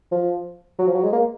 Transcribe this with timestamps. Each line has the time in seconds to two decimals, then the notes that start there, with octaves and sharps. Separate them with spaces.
0.12 F3
0.79 F#3
0.87 F3
0.95 F#3
1.03 G#3
1.12 A#3